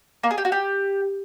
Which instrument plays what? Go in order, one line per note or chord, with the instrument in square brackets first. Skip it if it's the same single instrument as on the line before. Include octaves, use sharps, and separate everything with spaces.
[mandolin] A#3
G#4
G4
F#4
G4